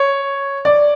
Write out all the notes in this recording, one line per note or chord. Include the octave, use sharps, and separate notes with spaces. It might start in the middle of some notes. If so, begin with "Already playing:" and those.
Already playing: C#5
D5